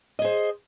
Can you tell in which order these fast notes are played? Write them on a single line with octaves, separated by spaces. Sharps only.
D#5 G#4 C5